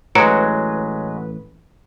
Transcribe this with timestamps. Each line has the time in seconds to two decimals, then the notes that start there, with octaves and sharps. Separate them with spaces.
0.15 A1 A2 F#3 G#3 B4 A#5 C#7 D7